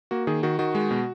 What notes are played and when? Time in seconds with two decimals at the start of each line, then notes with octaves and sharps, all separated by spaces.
0.11 A#3 F#4
0.27 D#3 G#4
0.43 D#3 F#4
0.59 D#3 F#4
0.75 G#3
0.91 B2